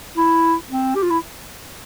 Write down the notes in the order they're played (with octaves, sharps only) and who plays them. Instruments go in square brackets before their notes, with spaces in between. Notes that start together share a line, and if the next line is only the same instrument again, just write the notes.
[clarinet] E4
C4
G4
F4
E4